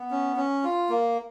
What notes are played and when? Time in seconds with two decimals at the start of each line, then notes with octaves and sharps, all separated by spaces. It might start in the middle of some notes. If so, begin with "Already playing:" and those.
Already playing: B3
0.11 C#4
0.36 C#4
0.64 F4
0.89 A#3